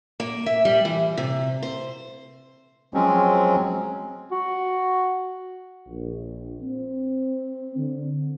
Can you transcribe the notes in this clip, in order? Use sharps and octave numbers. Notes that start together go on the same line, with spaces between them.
A#3
E5
G3
E3
C3
C5
F3 F#3 G#3 C4 C#4
F#4
A#1
C4
D3